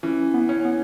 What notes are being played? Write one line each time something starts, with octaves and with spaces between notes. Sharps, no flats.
E3 C#4
B3
C#4
B3